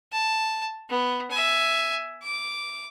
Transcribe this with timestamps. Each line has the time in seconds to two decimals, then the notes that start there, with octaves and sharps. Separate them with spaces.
0.13 A5
0.90 B3
1.31 E5 G#5
2.22 D6